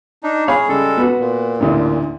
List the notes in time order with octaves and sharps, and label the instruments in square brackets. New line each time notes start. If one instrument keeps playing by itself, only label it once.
[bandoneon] D4 D#4
[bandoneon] G#4 [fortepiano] C#5 F5 B5
[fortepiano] C#3 [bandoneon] G3 G#3 A4
[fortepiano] B3 F#4
[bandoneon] A#2
[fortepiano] A1 D2 E3